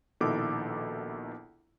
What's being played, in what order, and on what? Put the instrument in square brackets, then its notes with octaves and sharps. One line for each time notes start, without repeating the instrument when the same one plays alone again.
[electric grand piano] A#1 B2 D#3 E4 A4 D6